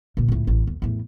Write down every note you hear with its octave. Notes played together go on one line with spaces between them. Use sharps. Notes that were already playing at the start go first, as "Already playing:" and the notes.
A#2 C#3
C#2 A2
A1 E2
D#2
E2 A2